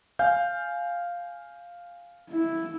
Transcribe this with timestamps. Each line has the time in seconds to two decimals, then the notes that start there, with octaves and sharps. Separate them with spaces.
0.19 F5 G#5 G6
2.30 E4